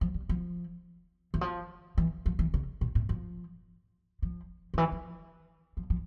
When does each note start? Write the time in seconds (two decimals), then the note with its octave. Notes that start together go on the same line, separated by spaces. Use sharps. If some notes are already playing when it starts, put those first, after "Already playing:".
0.01 F3
0.14 G3
0.29 F3
1.34 E3
1.41 F3
1.98 E3
2.26 F3
2.39 E3
2.54 C#3
2.81 A#2
2.95 A2
3.09 F3
4.22 F3
4.74 D3
4.78 E3
4.92 F3
5.77 F3
5.90 F3